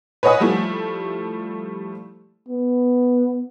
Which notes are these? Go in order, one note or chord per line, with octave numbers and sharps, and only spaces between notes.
B4 C#5 D#5 F#5 G#5 D#6
F3 G3 A3 E4
B3